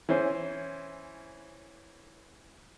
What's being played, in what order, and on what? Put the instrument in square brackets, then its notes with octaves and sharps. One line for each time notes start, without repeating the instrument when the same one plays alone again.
[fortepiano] E3 C#4 C5